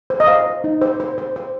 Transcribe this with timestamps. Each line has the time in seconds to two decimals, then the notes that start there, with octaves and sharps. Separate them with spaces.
0.10 C5
0.20 D#5
0.27 C5 F5
0.46 C5
0.64 D#4
0.81 C5
1.00 C5
1.18 C5
1.36 C5